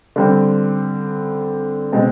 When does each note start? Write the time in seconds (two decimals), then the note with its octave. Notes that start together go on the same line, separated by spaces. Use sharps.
0.16 D3 G3 C4
1.92 B2 G#3 C4